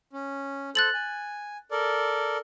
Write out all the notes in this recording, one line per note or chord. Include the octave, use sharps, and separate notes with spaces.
C#4
A4 C5 F#6 A6 F#7
G#5
A4 A#4 D5